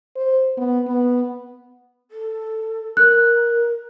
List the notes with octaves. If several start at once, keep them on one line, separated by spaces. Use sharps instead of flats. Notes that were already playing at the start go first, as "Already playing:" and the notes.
C5
B3
B3
A4
A#4 F#6